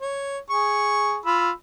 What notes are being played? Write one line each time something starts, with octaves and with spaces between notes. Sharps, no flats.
C#5
G#4 C#6
F4 B5 E6